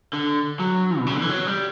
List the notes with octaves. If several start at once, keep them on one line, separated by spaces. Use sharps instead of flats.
D3
F#3
B2
C#3
D3
E3
F#3
G3